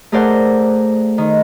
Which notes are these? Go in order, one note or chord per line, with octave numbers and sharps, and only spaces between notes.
A3 G#4 A#4 C5 D5 F#5
D#3